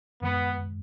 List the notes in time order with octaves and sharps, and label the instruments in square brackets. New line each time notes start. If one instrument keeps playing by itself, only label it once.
[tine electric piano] F#2 D#3 G#3 [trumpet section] B3